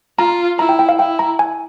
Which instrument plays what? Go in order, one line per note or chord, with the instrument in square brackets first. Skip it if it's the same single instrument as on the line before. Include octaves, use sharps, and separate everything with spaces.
[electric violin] F4 [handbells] A#5
[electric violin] E4 [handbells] A#5
[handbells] G5
G5
F5
[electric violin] E4 [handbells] G5
[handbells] A#5
G#5